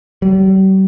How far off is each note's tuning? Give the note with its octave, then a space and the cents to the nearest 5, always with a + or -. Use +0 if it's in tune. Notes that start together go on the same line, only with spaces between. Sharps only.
G3 -40